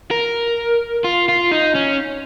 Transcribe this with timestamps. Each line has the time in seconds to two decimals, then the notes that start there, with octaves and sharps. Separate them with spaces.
0.11 A#4
1.04 F4
1.29 F4
1.52 D#4
1.75 C#4